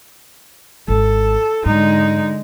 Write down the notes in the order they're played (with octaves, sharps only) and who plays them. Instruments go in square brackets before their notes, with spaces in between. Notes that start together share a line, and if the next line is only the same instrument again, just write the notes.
[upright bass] G#1 G#3 [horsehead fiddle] A4
[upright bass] G#2 [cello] D3 G#3 [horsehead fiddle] D#4